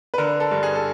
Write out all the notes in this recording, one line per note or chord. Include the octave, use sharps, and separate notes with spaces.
B4
D3 A#4
A4
G2
G#4
A4